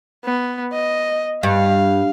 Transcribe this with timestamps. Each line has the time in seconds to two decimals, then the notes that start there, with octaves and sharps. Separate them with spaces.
0.25 B3
0.73 D#5
1.43 G2 F5